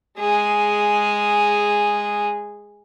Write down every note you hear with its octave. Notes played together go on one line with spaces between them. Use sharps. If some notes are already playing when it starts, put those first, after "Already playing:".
G#3 G#4